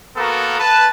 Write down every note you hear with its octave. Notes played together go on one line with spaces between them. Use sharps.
A#3 B3 F#4 A4 A#4
B4 A5